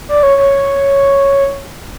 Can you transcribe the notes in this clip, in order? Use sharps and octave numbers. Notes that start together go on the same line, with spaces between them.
D5
C#5
C#5